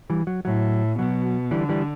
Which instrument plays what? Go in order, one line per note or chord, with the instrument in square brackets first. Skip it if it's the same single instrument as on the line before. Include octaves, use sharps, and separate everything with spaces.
[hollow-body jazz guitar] E3 G3
F#3
[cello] A2 [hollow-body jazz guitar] F#3
[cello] B2 [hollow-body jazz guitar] F#3
[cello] D3 [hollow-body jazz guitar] E3 G3
[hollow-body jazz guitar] E3 G3